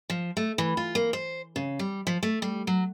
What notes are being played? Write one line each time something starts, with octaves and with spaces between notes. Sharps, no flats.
F3
A3
E3
F4
A#3
C5
C#3
G3
F3
A3
G3
F#3